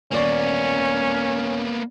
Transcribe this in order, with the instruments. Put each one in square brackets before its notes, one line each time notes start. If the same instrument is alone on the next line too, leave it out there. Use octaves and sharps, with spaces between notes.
[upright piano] D#1 D5 C#6 [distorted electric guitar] A#3 B3 [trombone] C#4